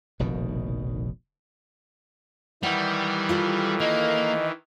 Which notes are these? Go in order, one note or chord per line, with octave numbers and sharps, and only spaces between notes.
F1 A#1 B2 D#3
D#3 E3 G3 F#5
F4 A4
A#3 D#5